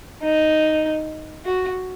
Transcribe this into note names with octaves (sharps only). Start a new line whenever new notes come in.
D#4
F#4